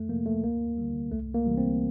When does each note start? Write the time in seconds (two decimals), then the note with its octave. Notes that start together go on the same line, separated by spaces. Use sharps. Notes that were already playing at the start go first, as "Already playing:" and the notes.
Already playing: F2 A3
0.09 F3 A#3
0.12 C3
0.26 A3
0.44 D2 A#3
0.78 D3 G3
1.12 C2 A3
1.34 A#3
1.46 C3 E3 G3
1.58 C4